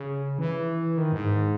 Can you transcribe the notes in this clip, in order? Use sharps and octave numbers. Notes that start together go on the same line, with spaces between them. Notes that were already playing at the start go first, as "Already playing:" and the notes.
Already playing: C#3
E3
D#3
G#2